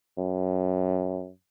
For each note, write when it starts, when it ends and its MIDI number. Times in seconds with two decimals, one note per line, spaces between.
0.18 1.30 42